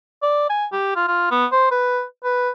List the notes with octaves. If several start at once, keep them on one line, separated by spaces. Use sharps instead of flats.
D5
G#5
G4
F4
F4
B3
C5
B4
B4